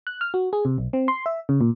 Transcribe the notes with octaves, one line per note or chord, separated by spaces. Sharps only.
F#6
F6
F#4
G#4
C3
B1
C4
C6
E5
C#3
A#2